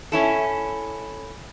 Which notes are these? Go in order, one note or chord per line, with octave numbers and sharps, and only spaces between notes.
C#4 E4 A4